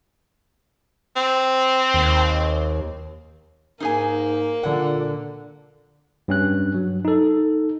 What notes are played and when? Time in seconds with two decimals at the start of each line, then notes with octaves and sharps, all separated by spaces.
1.16 C4
1.94 D#2
3.80 G#2 A#3 D#4 G#4 G#5
4.63 A#2 D3 F#5
6.28 G2 C#4 F#6
6.74 F#3
7.05 D#4 A4